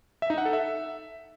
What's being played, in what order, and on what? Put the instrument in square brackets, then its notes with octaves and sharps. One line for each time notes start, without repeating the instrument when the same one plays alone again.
[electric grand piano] E5
D#4
F#5
A4
E5